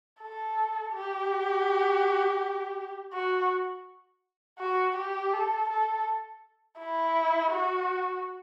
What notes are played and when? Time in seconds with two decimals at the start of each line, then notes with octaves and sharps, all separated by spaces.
0.21 A4
0.93 G4
3.13 F#4
4.59 F#4
4.96 G4
5.33 A4
5.69 A4
6.79 E4
7.51 F#4